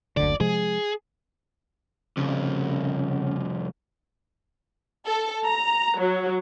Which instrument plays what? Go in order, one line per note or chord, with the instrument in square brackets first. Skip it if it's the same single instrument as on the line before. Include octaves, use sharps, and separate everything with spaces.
[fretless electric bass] F#1 D2 D3 [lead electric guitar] D5
[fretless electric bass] C3 F3 G#3 [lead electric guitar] G#4
[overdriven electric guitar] C2 F2 [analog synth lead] C#3
[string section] A4
A#5
F#3